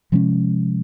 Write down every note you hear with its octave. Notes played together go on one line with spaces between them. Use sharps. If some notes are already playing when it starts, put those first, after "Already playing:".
C3 F3 G#3 C#4